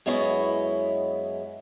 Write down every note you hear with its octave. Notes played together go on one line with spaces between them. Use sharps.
F#2 G#3 B3 E4 C#5 D#5